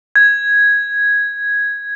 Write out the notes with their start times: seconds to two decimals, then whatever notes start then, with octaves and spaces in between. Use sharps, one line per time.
0.16 G#6